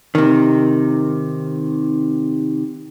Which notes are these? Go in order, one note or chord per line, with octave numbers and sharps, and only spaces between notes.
C3 D#3